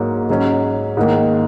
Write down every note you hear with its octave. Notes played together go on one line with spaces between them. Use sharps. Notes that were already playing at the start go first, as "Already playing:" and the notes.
Already playing: G#2 F#3 A#3
G#2 F#3 C#4
G#2 D#3 A#3